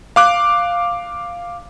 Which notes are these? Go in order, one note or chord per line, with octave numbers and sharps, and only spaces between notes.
F5 D6 F#6